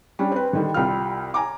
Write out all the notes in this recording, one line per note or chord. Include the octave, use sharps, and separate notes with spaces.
G3 C#4 D4
C4 B4
D3 D#3 G3
C2 G3 F4 F6
G#5 A#5 D6